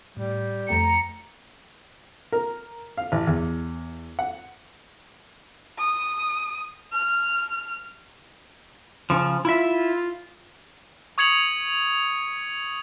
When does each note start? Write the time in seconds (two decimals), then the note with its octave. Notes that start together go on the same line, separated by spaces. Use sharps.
0.17 A2 G3
0.69 F2 A3 G5 A#5 C#7
2.32 A#4
2.98 F5
3.12 A1
3.27 E2
4.19 F#5
5.78 D#6
6.93 F6
9.10 C#3 F3
9.45 E4 F4 E5
11.18 C#6 D#6 G#6 C#7 F7 F#7